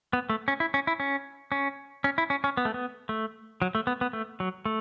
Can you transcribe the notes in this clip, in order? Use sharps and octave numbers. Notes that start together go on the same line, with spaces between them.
B3
A3
C#4
E4
C#4
E4
C#4
C#4
C#4
E4
C#4
C#4
B3
A3
B3
A3
F#3
A3
B3
B3
A3
F#3
A3